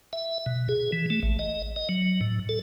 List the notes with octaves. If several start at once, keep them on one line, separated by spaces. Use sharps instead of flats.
E5
B2
G#4
E3
A3
A1
D#5
D#5
F#3
A2
A4